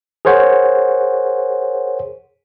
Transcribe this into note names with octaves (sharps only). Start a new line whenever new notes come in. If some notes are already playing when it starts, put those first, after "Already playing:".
G#4 A#4 C5 C#5 F#5